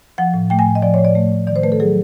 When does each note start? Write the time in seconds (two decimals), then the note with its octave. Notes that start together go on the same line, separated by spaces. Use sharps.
0.18 F3 F#5
0.34 A2
0.50 A3 G5
0.59 G#5
0.66 A2
0.75 D#5
0.82 F3 D5
0.94 A2 C#5
1.05 D5
1.15 A3
1.32 A2
1.47 D#3 D5
1.56 C5
1.63 A3 B4
1.72 A4
1.80 F#3 G#4